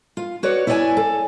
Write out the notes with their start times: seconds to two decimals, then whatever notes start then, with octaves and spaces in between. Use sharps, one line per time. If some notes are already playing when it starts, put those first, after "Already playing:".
0.17 F4
0.43 F#4 B4 C#5 D5
0.67 E4 C#5 D5 F5 G#5 A5
0.97 A4